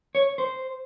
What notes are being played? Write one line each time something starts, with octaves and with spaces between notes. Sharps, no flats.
C#5
C5